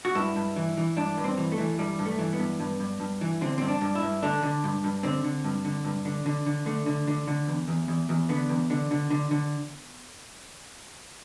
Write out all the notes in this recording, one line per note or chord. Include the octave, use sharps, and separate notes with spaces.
F#4
G2 E4
G2
E3
E3
G2 D4
G2
C4
E3
A3
E3
G2 G3
G2
A3
E3
B3
G2
G2
G2
G2
E3
D3 C4
G2 C4
D4
G2
E4
G2
D3 D4
D3
G2
G2
D3 C4
D3
G2
D3
G2
D3
D3
D3
D3 A3
D3
D3
D3
E2
E2
E2
E2
D3 B3
E2
D3
D3
D3
D3